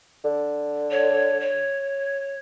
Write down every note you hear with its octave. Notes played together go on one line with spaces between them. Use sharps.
D3
C#5
C#5